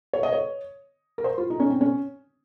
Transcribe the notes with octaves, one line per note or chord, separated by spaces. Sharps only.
C#5
D#5
C#5
A#4
C5
F4
D#4
C#4
C4
C#4